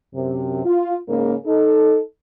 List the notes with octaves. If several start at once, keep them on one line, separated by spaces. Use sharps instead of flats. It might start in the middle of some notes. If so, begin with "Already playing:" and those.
F#2 C3
F4
G#2 C#3 A#3
D#4 A4